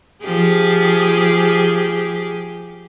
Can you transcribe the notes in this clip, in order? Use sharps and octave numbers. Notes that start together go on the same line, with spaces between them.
F3 G4 G#4